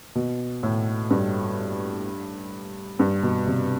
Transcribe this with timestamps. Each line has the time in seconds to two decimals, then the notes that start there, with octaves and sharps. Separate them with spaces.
0.15 B2
0.63 A2
1.10 G2
2.99 G2
3.23 B2
3.47 C3